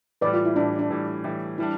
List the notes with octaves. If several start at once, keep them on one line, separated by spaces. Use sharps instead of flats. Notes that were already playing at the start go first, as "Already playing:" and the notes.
A2 E3 G3 B4 D5
F4
E4
A2 E3 G3 D4
D4
A2 E3 G3
A2 E3 G3
E3 G3 D4 E4